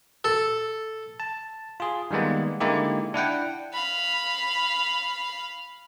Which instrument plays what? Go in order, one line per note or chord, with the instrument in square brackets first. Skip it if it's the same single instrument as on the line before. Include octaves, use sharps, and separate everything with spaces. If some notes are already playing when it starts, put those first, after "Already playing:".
[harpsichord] A4
[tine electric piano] A5
F4 G#4
D#3 G3 G#3 A#3 B3
D3 G#3 A#3 D#4 E4 G4
D4 E4 F#5 G5
[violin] F5 B5